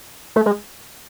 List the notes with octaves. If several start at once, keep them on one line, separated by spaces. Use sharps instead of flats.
A3
G#3